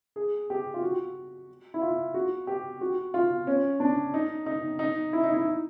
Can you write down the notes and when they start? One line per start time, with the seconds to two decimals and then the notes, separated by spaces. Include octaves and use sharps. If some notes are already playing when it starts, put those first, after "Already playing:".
0.16 G#4
0.50 G4
0.74 F4
0.82 F#4
1.74 E4
1.82 F4
2.14 F#4
2.47 G4
2.81 F#4
3.14 F4
3.47 C#4
3.80 D4
4.14 D#4
4.46 D#4
4.79 D#4
5.13 E4
5.23 D#4
5.34 E4